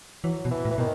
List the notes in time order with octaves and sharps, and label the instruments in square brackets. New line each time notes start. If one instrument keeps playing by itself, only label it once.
[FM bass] E3 [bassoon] F#3
[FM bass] B2
[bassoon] E3
[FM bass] A2
[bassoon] E3
[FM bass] B2 [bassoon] D#3